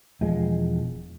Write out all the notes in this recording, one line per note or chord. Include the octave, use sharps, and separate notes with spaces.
E1 F3 G#3